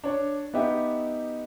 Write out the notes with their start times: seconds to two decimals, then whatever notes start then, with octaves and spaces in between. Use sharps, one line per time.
0.04 D4 C#5
0.53 B3 D#4 G4 E5